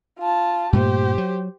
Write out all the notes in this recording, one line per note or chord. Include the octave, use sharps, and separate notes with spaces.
F4 A5
G2 A#2 A3 G4 C5
F#3